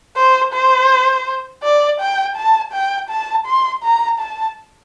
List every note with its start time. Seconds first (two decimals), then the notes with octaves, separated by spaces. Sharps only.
0.16 C5
0.53 C5
1.63 D5
2.00 G5
2.36 A5
2.73 G5
3.09 A5
3.47 C6
3.83 A#5
4.19 A5